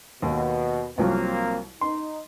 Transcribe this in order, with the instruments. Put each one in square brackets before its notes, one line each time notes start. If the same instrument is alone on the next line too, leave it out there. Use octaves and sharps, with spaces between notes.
[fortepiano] D#2 [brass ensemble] B2
[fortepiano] C2 F3 F#3 [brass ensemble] A#3 C4
[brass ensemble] D#4 [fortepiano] C6